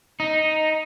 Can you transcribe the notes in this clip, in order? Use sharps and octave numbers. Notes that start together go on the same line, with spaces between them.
D#4